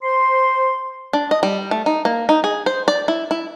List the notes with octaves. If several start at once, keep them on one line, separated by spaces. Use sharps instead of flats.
C5 C6
D4
D#5
G3
A3
D#4
A#3
D#4
G#4
C5
D5
E4
E4